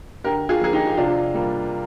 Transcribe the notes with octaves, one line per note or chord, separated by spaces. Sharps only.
D3 G4 A#4
F4 G#4
F3 A#3 G#4
D#4 G4
G4
C3 D4 F4
G3 A#3